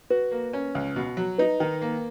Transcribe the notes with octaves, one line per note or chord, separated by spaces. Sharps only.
F#4 B4
A#3
C#4
C#2
B2
F#3
D#4 B4
D#3
A#3